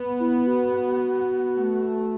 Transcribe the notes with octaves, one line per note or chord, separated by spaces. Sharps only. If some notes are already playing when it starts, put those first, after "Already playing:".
Already playing: B3
E4
F#4
A3